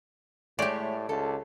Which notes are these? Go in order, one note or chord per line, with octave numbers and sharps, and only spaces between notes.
A2 G#3 A3 G4 C#5 D5
C#2 A4